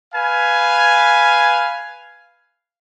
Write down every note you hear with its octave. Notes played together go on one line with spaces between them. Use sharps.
B4 F5 G#5